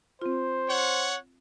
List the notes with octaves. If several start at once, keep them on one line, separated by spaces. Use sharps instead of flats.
C4 F4 C5
C#5 F#5